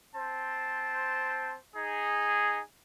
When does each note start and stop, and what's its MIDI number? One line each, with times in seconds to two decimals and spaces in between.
0.15 1.55 60
0.15 1.55 72
0.15 1.55 81
1.76 2.59 63
1.76 2.59 68